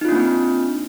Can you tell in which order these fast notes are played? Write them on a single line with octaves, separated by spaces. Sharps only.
D#4 F4 D4 A#3 C4